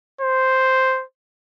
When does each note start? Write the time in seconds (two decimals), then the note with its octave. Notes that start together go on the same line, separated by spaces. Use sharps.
0.21 C5